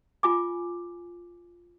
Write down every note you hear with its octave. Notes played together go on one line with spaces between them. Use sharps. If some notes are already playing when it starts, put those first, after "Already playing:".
F4 G#5 D6